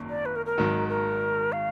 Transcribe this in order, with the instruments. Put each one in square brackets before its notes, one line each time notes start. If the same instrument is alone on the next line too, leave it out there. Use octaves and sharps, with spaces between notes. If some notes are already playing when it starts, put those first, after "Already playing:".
Already playing: [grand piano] G#1 F#2 D#3 A#3
[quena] D5
B4
A#4
A#4
[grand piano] G#1 G#2 D#3 F#3
[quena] A#4
F5